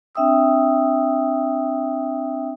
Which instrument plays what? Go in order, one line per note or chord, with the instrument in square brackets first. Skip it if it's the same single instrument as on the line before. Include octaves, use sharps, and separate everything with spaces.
[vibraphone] C4 D4 E5 G5 D#6 E6